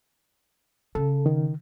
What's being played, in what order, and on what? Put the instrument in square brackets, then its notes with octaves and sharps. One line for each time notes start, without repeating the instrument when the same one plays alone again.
[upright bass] C#3 [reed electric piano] A4
[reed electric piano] D#3